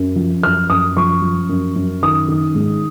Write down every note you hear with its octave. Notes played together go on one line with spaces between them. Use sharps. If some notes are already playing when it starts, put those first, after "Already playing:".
Already playing: F#2
F3
F#2 F6
F#2 D#6
F3 C#6
F3
F#2
F#2
D#3 D#6
D#3
G#2